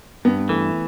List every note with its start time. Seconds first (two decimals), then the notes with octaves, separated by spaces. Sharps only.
0.25 G2 B3
0.49 E3 A3